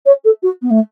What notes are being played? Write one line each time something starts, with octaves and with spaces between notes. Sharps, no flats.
C#5
A4
F#4
B3
A3